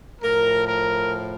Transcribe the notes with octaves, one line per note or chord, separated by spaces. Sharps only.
A2 F3 A#4
A#4